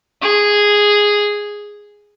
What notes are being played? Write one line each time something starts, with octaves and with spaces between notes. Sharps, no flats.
G#4